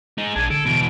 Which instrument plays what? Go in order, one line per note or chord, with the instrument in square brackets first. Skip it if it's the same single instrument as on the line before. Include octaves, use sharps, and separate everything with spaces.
[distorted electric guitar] G#3 D#4
[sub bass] A#1 [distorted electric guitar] D4 G#4 [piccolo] G#6
[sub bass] D3 [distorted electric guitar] A4 [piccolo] D7
[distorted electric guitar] E2 B2